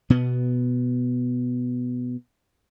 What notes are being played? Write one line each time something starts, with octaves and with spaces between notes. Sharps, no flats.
B2 B3